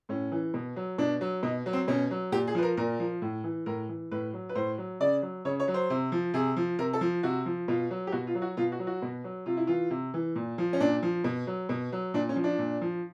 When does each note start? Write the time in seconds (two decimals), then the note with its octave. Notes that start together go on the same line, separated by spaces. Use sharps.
0.09 A2 C#4
0.32 E3
0.54 B2
0.76 F#3
0.98 B2 D4
1.21 F#3
1.43 B2 D#4
1.66 F#3
1.73 C4
1.88 B2 C#4
2.11 F#3
2.32 A#2 G4
2.47 G#4
2.55 F3 B4
2.63 A#4
2.77 A#2 A#4
3.00 F3
3.22 A2
3.44 E3
3.66 A2 A#4
3.89 E3
4.11 A2 B4
4.33 F#3
4.49 B4
4.55 A2 C5
4.78 F#3
5.00 C#3 D5
5.22 F#3
5.45 C#3 C#5
5.60 C#5
5.68 F#3
5.74 C5
5.90 C3
6.12 F3
6.34 C3 G#4
6.56 F3
6.79 C3 A#4
6.93 A4
7.01 F3
7.23 C3 F#4
7.46 F3
7.68 B2 F4
7.91 F#3
8.07 G4
8.12 B2 F#4
8.27 F4
8.35 F#3
8.42 F#4
8.57 B2 F4
8.72 F#4
8.79 F#3
8.87 F#4
9.02 B2
9.24 F#3
9.46 C3 F4
9.57 E4
9.67 E3 F4
9.90 C3
10.14 E3
10.35 A#2
10.58 F3
10.73 C#4
10.80 A#2 D4
11.03 F3
11.24 B2
11.47 F#3
11.69 B2
11.92 F#3
12.14 A#2 D4
12.29 C#4
12.36 F3
12.44 D4
12.59 A#2
12.81 F3